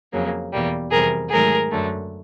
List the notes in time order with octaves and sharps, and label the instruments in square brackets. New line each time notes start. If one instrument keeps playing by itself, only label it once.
[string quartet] F2 C#3 F#3 A#3
E2 B2 G3 A#3
F2 C3 E3 G3 G#4 A#4
G#2 D#3 F#3 A3 G#4 A#4
F#2 D3 F#3 A3